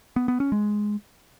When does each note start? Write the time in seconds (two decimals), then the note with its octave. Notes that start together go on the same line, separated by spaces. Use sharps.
0.16 B3
0.28 B3
0.40 C#4
0.52 G#3